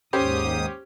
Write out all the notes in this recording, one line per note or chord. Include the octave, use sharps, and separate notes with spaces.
D#2 G#2 C#4 G4 C5 D#6